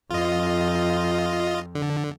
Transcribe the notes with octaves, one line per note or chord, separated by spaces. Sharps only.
F2 F4 D#5
D3